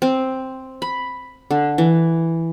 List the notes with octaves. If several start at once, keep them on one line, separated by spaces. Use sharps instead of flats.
C4
B5
D3
E3